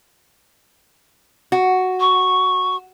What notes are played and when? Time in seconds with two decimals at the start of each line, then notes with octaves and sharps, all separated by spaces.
1.52 F#4
2.00 C#6